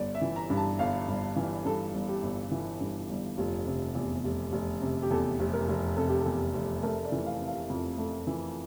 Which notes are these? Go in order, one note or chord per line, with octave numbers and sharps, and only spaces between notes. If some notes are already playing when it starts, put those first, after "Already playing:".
Already playing: G1 D5
E5
E3
A#5
G2
A5
G1 F5
G1
E3
G2 A4
G1
G4
G1
E3
G2
G1
F1 F4
C3
E2
F1
F1
C3
G4
E2 A4
F1
A#4
F1
C3 A4
G4
E2 A4
F1
A3 A#4
D5
E3
F5
C3
F5
F2
A3
E3